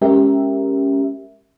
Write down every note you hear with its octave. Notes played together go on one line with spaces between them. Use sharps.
G#3 C#4 G4 A#4 E5